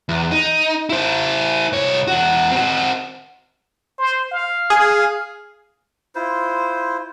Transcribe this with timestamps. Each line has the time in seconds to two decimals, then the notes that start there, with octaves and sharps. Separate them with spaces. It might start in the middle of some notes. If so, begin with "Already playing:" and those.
0.09 E2
0.32 D#4
0.90 E4 C5
1.73 C2 C#5
2.08 E2 F#4
2.51 C4 F#4
3.98 C5
4.31 F5
4.70 G#4
6.15 E4 F4 C5